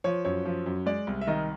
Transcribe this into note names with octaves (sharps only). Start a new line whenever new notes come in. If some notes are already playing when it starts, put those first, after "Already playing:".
F3 C#5
F#2 C#5
F3
F#2
G#3 D5
C2
E5
D#3 D#5